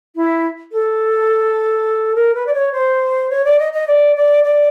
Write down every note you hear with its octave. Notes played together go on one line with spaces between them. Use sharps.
E4
A4
A#4
B4
D5
C#5
C5
C#5
D5
D#5
D#5
D5
D5
D5